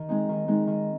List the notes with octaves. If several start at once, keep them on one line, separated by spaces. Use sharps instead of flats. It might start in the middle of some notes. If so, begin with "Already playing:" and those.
Already playing: D#3
G#3 C4 D#4
D#3
G#3 C4 D#4
D#3